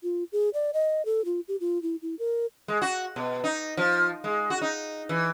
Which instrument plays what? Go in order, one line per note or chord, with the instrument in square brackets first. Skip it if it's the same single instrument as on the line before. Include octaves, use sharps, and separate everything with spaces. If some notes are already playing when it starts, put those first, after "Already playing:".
[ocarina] F4
G#4
D5
D#5
A4
F4
G4
F4
E4
E4
A#4
[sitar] G#3
F#4
B2
D#4
F3
G#3
F#4
D#4
E3